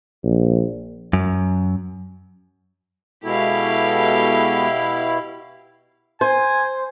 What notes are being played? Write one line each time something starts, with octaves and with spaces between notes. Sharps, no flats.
A#1
F#2
B2 G#3 B3 E4 F#4 G4 A4 F5
C5 G#5